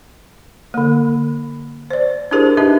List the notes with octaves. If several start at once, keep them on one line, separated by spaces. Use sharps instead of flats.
D3 A#3
C5 D5
D4 E4 G4 G#4 A#4 C5
D4 D#4 G4 B4 D#5 E5